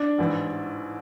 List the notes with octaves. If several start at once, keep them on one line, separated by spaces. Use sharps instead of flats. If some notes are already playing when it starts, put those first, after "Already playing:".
Already playing: D4
A1 G#2 E3